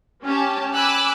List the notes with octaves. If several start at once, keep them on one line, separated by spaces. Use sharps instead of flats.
C#4 G4 A5
G#5 B5 D6 E6 F#6